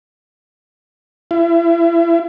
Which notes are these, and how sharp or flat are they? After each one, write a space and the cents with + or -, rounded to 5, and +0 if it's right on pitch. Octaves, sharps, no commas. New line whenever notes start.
E4 +35